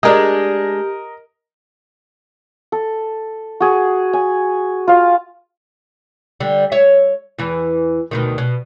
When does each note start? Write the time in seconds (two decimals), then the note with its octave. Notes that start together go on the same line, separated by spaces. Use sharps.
0.03 G#3 D4 G4 A#4 D#5
2.72 A4
3.60 F#4 G#4
4.13 G#5
4.88 F4 F5
6.40 D3 G3
6.72 C#5 E5
7.38 E2 E3
8.11 D2 B2 D#3
8.38 B2